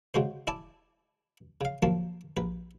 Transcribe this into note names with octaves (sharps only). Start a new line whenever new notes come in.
C#3 G#3 F#4 C5
E4 D5 G#5 A5
C#3 F5
F#2 F3 A#3 A5
A#1 B4